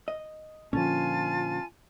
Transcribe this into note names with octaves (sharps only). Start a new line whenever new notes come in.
D#5
A#2 D3 F3 C#4 F4 G#5 A5